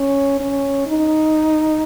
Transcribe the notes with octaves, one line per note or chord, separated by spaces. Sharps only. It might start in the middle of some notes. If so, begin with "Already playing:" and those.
Already playing: C#4
C#4
D#4